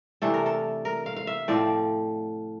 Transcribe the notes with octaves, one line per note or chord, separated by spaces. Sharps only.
C3 E3 A3 D4 A4
A#4
A4
A#4
F5
F5
E5
A2 F3 C4 D5